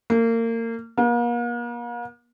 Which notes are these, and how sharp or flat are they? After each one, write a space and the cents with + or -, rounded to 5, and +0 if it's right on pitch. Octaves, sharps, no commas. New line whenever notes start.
A#3 -30
A#3 +40